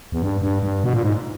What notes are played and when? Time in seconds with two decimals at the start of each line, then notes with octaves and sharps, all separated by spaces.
0.12 E2
0.22 G2
0.42 G2
0.63 G2
0.84 B2
0.93 A#2
1.03 G#2